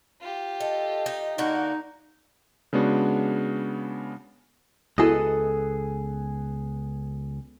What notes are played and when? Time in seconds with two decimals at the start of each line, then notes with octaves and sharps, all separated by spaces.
0.21 F4 G4
0.60 A4 D#5
1.06 D#4
1.38 D3 A#3 D#4 F#4
2.73 C#3 G#3 B3 D4 F#4
4.98 C#2 B3 E4 F#4 G#4 A4 D#5